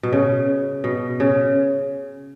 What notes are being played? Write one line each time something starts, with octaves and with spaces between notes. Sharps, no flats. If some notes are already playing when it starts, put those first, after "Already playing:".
B2
C#3
B2
C#3